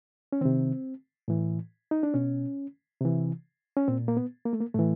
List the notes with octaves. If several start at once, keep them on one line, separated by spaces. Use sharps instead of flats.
C#4
C3 D#3 C4
A2 E3
D#4
D4
B2 C#4
C3 E3
C#4
A#2 C4
A#3
B3
A#3
A3
A#3
A2 E3 A3